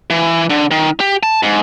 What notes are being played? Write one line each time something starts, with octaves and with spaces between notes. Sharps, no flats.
E3
D3
D#3
G4
A5
G#2